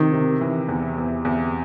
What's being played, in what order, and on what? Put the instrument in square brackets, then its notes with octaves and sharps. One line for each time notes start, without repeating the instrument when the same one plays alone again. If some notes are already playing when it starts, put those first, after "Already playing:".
Already playing: [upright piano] C3 [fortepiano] D#3
[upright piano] C3
E3
E2
E2
E2